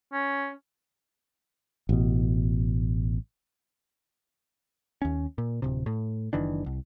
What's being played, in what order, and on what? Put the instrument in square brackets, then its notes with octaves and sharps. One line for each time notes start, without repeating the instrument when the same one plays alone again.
[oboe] C#4
[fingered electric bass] A1 B2
[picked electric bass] D#2 C#4
A#2
D1 C3
A2
F#1 D#3 E3 D4
C2